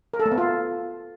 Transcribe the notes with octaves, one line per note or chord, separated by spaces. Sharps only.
A#4
A4
A3
B3
F4